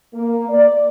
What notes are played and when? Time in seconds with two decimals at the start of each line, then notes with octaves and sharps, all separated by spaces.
0.14 A#3
0.49 D5